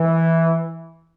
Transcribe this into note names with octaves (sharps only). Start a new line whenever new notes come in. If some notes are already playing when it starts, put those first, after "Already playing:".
Already playing: E3